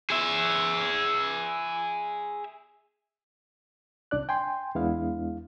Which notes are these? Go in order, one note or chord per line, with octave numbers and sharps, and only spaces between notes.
G#4 E5
C2 D4 D5 F#6
G5 G#5 C6
E2 G#3 B3 D4 E4 F5